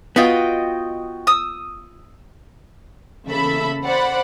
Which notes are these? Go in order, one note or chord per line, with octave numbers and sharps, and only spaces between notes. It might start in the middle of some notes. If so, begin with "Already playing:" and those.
B3 F4 F#4 D#5 G5
D#6 E6
E2 C#3 A#3 A4 E5 B5
C5 D5 F#5 B5